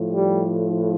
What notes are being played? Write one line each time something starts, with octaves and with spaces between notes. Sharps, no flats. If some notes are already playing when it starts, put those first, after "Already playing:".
Already playing: A2 F3
G3